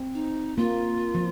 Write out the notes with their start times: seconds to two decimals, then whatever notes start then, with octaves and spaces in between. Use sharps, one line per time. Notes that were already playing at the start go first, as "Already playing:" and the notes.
Already playing: C4
0.14 D#4
0.57 A#3 F4
1.15 F3